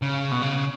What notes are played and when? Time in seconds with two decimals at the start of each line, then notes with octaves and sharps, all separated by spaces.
0.02 C#3
0.32 B2
0.43 C#3